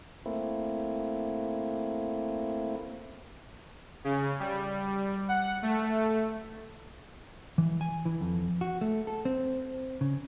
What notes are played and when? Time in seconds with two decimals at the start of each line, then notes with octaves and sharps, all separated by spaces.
0.26 A3 A#3 C4 E4
4.04 C#3
4.40 G3
5.29 F#5
5.63 A3
7.58 E3
7.81 G#5
8.05 E3
8.21 F2
8.61 F#4
8.81 A3
9.07 A4
9.25 C4
10.01 C#3